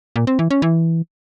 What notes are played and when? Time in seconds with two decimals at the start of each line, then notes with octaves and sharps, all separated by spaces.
0.16 A#2
0.27 C4
0.39 E3
0.51 C#4
0.62 E3